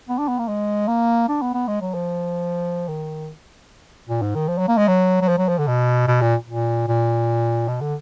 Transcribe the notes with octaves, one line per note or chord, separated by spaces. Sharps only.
B3
D4
B3
A#3
G#3
A#3
D4
B3
B3
G#3
F#3
F3
D#3
A#2
G#2
D#3
F3
F#3
A#3
G#3
F#3
F#3
F3
F#3
F3
D3
B2
B2
A#2
A#2
A#2
B2
D3